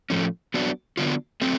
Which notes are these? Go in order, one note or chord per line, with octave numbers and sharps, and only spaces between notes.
A2 F3 A3 C#4
F#3 B3 D4 F#4
D3 F#3 B3 D4 F4
F#3 A3 C4